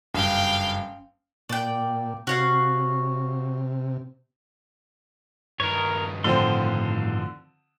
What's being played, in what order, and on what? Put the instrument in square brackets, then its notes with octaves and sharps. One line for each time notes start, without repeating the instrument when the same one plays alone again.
[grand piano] F#1 G2 [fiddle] F5 G5
[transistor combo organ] A#2 [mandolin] D5 G5
[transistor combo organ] C3 [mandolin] F#4 C#5 F5
[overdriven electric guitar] G2 D#3 [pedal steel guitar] A#4 C#5
[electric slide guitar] A2 [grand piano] D3 F3 C4 [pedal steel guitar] C6